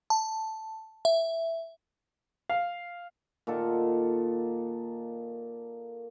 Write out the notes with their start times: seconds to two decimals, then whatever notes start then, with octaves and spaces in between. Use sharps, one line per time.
0.10 A5
1.05 E5
2.50 F5
3.47 A#2 D#3 A4 F#5